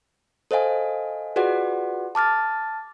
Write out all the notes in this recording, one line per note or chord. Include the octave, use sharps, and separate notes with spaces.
A4 C5 D#5 F5 G#5
F4 F#4 G#4 B4 D5 F#5
A5 D6 F6 A6